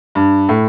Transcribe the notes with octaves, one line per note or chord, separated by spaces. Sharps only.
G2
A2